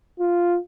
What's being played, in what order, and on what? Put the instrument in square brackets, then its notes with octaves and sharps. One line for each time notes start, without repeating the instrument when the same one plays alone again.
[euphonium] F4